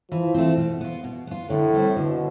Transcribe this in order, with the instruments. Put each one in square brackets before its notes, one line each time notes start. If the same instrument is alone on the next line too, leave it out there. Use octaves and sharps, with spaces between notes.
[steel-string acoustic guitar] E3 [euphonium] F3
[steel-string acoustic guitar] A3 C4
B2
B3 F4
B2
B3 F4
[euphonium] A2 [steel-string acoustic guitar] D3
[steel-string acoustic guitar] G3 C4 E4
[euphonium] B2 [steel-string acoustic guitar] D3